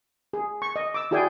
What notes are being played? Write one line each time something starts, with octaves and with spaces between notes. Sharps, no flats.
G#4
C#6
D#5
D6 E6
E4 F#4 G#4 D5 G5 G#5